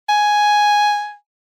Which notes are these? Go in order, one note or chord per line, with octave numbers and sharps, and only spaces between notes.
G#5